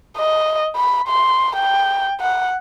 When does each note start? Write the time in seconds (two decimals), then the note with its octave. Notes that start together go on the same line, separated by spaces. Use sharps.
0.17 D#5
0.76 B5
1.08 C6
1.56 G5
2.21 F#5